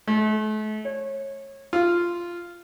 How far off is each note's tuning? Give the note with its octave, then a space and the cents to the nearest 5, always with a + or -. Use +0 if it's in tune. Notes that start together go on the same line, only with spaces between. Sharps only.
A3 -40
C#5 -25
F4 -10